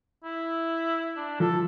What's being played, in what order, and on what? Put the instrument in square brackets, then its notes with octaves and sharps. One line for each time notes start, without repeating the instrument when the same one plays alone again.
[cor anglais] E4
D4
[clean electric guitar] F3 [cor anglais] A4